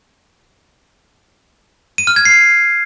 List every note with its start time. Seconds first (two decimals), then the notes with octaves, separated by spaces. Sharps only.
1.98 D#7
2.07 F6
2.16 G#6
2.25 C7